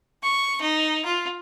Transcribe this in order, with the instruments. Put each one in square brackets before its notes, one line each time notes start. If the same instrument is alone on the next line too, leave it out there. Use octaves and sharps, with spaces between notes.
[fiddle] C#6
D#4
F4